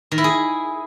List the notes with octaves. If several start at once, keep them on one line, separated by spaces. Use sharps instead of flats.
D#3
E4
G#4